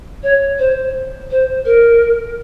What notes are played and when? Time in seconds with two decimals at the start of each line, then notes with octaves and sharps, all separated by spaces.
0.22 C#5
0.58 C5
1.30 C5
1.65 A#4